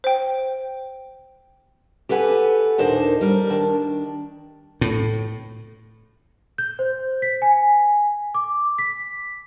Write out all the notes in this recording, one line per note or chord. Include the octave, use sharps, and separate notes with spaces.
C5 G5
G4 A4 B4 F#5 G#5
D#2 A#2 D4 D#4 A#4 C5
G3 A#4
D#3 D4
A2
G6
C5
B6
G#5
D6
B6